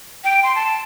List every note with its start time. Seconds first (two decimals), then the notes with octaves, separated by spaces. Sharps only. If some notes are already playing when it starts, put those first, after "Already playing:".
0.24 G5
0.43 C6
0.55 A5